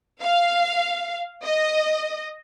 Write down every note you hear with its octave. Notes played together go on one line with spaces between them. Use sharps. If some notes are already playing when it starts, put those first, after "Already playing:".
F5
D#5